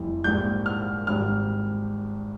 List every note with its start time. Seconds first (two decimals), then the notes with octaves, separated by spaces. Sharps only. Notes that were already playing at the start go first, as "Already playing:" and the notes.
Already playing: F1 F2 E3 G3
0.24 A#1 G#2 G3 G6
0.66 F6
1.07 G#1 G#2 G3 F6